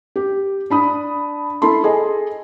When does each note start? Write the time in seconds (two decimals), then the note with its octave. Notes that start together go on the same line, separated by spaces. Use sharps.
0.16 G4
0.70 D4 B5 D#6
1.62 E4 A4 B5 C6
1.84 G#4 A4 D#5 G#5